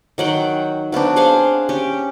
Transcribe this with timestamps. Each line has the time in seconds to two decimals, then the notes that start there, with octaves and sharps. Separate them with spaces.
0.18 D#3 F#3 F#5 G5
0.92 F#3 B3 C4 D4
1.16 G#4 C5 F5 F#5
1.69 C#4 G4